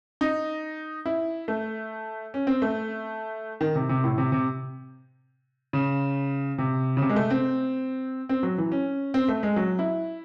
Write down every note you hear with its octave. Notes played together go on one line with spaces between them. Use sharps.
D#4
E4
A3
C#4
C4
A3
D#3
C3
C3
A2
C3
C3
C#3
C3
C#3
C3
G#3
A3
C4
C4
F#3
E3
C#4
C4
A3
G#3
F#3
E4